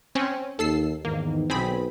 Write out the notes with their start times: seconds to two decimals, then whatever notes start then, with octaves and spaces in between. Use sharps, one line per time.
0.15 C4 C#4
0.59 D#2 A4 E6 C7
1.05 E2 G#2 D#3 A#3
1.50 B1 C4 G#4 B5